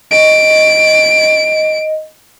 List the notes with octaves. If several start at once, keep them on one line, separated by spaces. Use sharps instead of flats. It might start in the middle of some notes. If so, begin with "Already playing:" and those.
D#5 D7